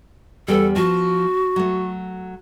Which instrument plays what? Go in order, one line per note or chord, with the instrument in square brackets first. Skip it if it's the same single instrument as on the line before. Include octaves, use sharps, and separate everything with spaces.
[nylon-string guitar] E2 G3 [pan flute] A4
[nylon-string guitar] F3 [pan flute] F#4
[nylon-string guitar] F#3 A3